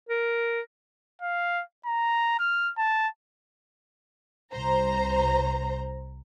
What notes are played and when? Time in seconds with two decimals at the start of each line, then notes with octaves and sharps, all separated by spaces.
0.09 A#4
1.22 F5
1.86 A#5
2.39 F6
2.77 A5
4.53 C2 C5 A#5